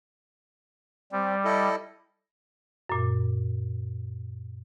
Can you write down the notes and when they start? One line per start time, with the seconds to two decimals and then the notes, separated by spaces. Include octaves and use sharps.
1.12 G3 C4
1.45 E4 A4 D#5
2.90 F#2 A#2